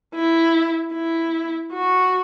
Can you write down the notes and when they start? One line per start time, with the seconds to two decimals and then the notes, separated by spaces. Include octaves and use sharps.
0.15 E4
0.94 E4
1.73 F#4